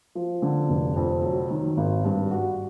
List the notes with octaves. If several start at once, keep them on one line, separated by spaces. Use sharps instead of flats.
F3
D3
F1
F2
F#3
D#3
G#1
G2
F#4